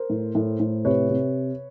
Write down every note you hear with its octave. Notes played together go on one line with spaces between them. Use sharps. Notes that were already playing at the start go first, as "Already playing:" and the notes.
Already playing: A#4 C5
A2
A2
A2
C3 B4 C#5
C3